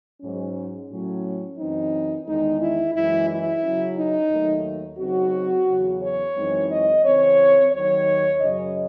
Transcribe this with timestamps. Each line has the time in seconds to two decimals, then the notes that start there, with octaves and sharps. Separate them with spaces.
0.21 G#2 F#3 C#4
0.89 A2 F#3 C#4
1.57 F#2 E3 C4 D#4
2.26 E2 D#3 G#3 D#4
2.60 E4
2.94 F#2 E3 G#3 E4
3.28 E4
3.62 C#3 F#3 C#4
3.97 D#4
4.30 D#2 D#3 F#3 A3
4.98 C#3 F#3 C4 D#4 F#4
5.68 E2 C#3 F#3 C#4
6.02 C#5
6.35 F#2 E3 G#3 C4 D#4
6.69 D#5
7.04 C#3 E3 C4 C#5
7.72 D#2 D#3 F#3 C#5
8.40 F#2 C#3 F#3 C#4 D#5